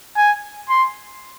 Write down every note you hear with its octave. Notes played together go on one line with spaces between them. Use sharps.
G#5
C6